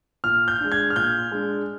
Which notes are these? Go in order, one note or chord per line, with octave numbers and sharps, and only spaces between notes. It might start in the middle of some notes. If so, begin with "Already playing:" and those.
A#2 F6
G6
G#3 D4
G#6
F6
A#2 G6
G#3 D4